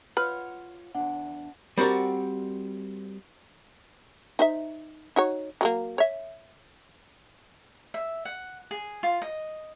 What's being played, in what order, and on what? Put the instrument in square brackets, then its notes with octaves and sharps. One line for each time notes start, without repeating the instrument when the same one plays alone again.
[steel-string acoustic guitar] F4 C#5 F#5 [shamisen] B4 [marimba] F6
[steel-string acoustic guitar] E2 D4 [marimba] F#5
[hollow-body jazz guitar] G3 C4 F#4 A#4 D5
[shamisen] D#4 C5 E5
D#4 F#4 C#5
F#3 A3 A#3
C#5 E5
[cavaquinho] E5
F#5
G#4
F4
D#5